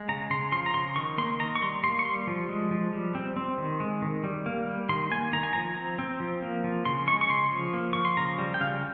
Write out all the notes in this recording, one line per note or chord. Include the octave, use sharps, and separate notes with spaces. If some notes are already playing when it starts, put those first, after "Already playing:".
Already playing: G#3
C#3 A#5
C#3 C6
F3 C6
A#5
C#3 C6
D#3 C#6
A#3 C6
D#3 A#5
C#6
G3 C6
A#3 C6
C#6
G3 C6
F3
G#3
F3
G3
C4
C4
D#3
G#3
D#3
G3
A#3
G3
D#3 C6
A#3 G#5
D#3 A#5
G#5
F3 A#5
C4
C4
F3
A#3
F3
C#3 C6
G#3 C#6
C#6
C#3 C6
F3
A#3
F3 C#6
C6
C#3 A#5
G3
G5
C#3 F5